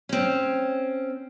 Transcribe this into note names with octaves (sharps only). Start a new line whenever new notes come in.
C4 C#4